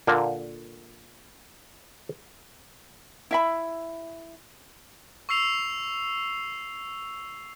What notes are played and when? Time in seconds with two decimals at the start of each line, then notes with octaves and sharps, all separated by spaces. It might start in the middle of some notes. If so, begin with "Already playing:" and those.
0.07 A#2 D3 A#3
3.31 E4 E5 B5
5.29 C#6 E6 C7 F7